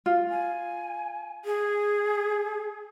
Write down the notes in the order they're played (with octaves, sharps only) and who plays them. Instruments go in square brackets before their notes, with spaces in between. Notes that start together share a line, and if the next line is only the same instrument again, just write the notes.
[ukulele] F4
[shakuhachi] G#5
G#4